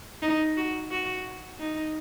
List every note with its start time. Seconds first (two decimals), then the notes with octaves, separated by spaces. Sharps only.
0.22 D#4
0.57 F#4
0.91 F#4
1.59 D#4